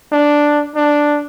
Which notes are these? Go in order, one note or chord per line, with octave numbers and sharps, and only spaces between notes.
D4
D4